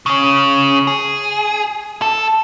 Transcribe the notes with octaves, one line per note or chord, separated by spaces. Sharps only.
C#3 C#4
G#4
A4